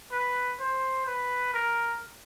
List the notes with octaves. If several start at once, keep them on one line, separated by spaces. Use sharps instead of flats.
B4
C5
B4
A#4